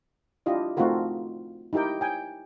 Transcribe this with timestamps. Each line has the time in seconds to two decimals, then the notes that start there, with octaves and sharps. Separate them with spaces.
0.46 D4 E4 F4 G4 D#5
0.77 A3 C4 D#4 F4 F#4 A#4
1.73 D#4 E4 G4 A#4 G5
2.01 G5 G#5